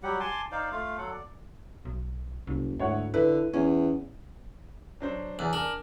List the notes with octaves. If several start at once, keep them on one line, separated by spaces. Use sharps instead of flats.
F#3 G3 G4 F#5
G#5 A5 C6 D6
D#4 C5 D5 F5
A3 F4 F5
F#3 A4 F#5
D5
B1
F#1 C2
D2 G#2 E4 C#5 F#5
D3 E4 B4
E2 C#4
F#3 D4 C5
E2 D5 G#5 F#6
D4 A#4 G#5